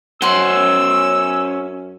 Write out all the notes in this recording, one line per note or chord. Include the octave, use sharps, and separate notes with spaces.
F#2 C#4 C5 F#5 C6 E6